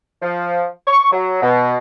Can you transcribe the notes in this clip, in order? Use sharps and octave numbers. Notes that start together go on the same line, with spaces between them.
F3
C#6
F#3
B2